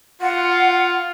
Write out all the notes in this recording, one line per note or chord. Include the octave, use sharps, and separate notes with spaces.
F4 F#5